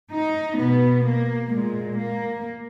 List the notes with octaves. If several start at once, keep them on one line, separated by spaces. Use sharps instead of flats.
D#4
B2 B3
A#3
A#2 G#3
A#3